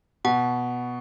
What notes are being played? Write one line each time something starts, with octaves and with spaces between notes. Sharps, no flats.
B2 F#5